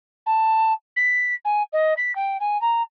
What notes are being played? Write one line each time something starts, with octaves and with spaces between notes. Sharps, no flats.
A5
B6
G#5
D#5
B6
G5
G#5
A#5